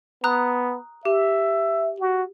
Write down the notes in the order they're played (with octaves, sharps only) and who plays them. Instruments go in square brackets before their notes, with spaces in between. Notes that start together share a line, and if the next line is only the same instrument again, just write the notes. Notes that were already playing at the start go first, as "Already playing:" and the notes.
[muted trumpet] B3 [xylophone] A#5 D#6 F#6
[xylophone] G4 [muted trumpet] E5
[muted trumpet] F#4